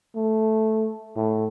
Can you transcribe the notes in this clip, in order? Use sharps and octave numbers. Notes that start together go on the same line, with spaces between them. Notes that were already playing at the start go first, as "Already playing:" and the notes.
A3
A2